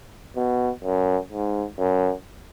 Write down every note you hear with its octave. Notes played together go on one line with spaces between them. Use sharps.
B2
F#2
G#2
F#2